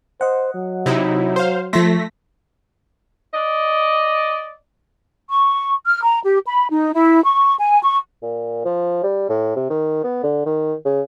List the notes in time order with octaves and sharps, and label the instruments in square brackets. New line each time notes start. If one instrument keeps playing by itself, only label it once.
[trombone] C5 [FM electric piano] D#5 F#5
[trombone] F#3
[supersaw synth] C3 D#4 E4
C5 F5
[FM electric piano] F3 C6 [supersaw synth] A3 A#6 B6
[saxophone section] D5 D#5
[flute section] C#6
F6
A#5
G4
B5
D#4
E4
C#6
G#5
C#6
[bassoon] A#2
F3
G3
A2
C3
D#3
B3
D3
D#3
C#3